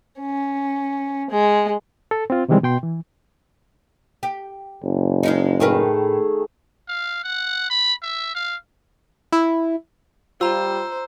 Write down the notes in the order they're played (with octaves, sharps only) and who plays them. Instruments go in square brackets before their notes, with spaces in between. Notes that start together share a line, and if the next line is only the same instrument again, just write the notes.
[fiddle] C#4
G#3
[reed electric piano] A4
C4 F4
C3 D#3 E3 G3 G#3 C4
B2 G5 C6
E3
[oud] G4
[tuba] F#1
[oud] G#3 C#4 D#4
[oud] A2 A#4 B4 [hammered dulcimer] D#3 A3 G#4
[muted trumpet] F5
F#5
B5
E5
F5
[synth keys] E4
[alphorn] G3 [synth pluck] F4 [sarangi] C5 [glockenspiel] A#5 E6